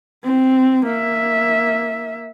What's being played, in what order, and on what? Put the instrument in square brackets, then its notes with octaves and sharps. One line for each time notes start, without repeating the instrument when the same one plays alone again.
[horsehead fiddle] C4
A#3 E5